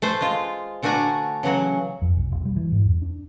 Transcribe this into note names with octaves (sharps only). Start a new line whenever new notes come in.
A3 B4 C5
G#3 F4
D3 A3 D4 F#4 G#5 A#5
C#3 E3 F#3 F#4
F2
B1
E1
G3
E3
G#2
E2
D4